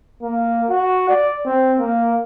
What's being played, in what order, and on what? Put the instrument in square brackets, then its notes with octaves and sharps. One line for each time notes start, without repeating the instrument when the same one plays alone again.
[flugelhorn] A#3
F#4
D5
C4
A#3